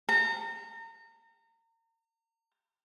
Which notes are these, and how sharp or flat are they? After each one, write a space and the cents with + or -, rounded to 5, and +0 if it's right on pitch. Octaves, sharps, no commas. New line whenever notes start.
A#5 -35